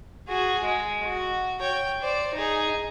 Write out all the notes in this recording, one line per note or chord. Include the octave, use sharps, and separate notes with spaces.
F#4 G#4
G#3
F#4
C#5 G5
C5 D5
D#4 G#4